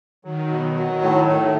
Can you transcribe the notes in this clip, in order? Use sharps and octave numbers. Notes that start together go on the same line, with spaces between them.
D#3 F#3
B2
D#3 F#3
A2
A3